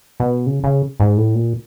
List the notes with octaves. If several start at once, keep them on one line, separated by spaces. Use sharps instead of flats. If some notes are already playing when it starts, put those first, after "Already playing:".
B2
C#3
C#3
G#2
A2
A#2